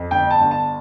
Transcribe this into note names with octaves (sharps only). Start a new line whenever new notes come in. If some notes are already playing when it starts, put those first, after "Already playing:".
Already playing: F2
G1 G5
A5
G1
A5